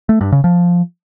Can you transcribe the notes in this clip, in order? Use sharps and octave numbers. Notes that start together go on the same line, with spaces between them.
A3
G2
C#3
F3